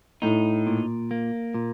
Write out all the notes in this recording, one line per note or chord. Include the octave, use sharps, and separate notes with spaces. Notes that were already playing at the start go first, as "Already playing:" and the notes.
A2 D#4
A#2
A#3
A#2